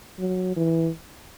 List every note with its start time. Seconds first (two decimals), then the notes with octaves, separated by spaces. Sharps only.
0.19 F#3
0.56 E3